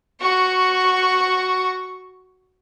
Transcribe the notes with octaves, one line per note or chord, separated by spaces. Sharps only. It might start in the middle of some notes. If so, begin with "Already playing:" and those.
F#4 C#6